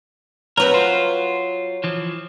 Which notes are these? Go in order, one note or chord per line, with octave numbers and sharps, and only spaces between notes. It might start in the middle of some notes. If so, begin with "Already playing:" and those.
F#3 C4 A#4 B4
F4 C5
E3 F3